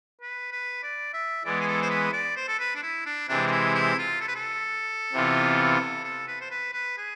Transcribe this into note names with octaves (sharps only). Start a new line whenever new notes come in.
B4
B4
D5
E5
E3 G#3 B3 D5
G#4
A4
C5
B4
D5
C5
A4
B4
D4
E4
D4
C3 E3 G#3 C4 D4
D4
E4
E4
F4
A4
B4
A4
C3 E3 B3 F4
A4
B4
C5
B4
B4
G#4